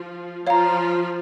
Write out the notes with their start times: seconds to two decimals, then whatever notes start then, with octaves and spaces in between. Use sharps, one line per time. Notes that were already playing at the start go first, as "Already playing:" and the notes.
Already playing: F3 F4
0.45 F3 F4 C#5 F5 A#5